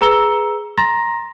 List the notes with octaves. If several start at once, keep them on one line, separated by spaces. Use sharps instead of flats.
G#4 B4 A#5 E6 C#7 G7
A#5 C6 A6 A#6